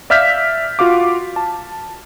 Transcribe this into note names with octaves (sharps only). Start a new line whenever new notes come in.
D5 E5 F5 F6 G6 B6
F4 F#4 F5 D6
A5